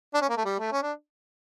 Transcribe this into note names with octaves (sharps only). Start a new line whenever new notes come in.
D4
C#4
A#3
A3
G3
A3
C#4
D4